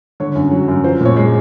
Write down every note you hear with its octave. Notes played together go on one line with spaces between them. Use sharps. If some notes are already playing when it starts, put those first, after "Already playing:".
D3 C#5
F#2
F#3
F#2
F3 C5
A#2 C#5
G#3